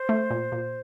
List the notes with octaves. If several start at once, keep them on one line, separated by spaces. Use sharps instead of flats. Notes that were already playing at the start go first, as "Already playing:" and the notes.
Already playing: C5
A3
A#2
A#2